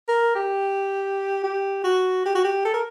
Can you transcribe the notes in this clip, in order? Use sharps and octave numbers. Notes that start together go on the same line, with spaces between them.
A#4
G4
G4
F#4
G4
F#4
G4
A4
A#4